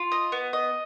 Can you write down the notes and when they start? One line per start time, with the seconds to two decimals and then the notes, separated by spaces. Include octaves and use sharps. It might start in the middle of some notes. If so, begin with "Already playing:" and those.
Already playing: F4
0.12 D#5
0.32 B3
0.53 D#5